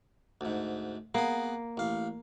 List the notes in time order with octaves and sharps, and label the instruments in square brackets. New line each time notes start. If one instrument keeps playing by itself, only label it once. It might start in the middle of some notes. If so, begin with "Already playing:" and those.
[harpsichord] D2 G#2
[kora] A#3 [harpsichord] B3 G#4
[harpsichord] A1 F5